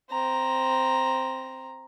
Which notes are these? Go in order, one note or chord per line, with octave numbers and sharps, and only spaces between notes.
C4 A#5